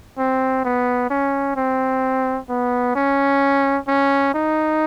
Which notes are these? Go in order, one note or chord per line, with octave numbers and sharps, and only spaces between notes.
C4
B3
C#4
C4
B3
C#4
C#4
D#4